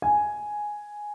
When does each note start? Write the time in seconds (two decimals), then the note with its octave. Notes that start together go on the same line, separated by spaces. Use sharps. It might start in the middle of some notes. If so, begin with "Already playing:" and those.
0.02 G#5